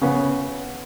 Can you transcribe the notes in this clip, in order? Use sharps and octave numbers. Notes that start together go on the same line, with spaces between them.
C#3 B3